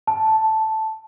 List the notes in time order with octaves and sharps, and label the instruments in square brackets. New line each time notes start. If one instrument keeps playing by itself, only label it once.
[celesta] A5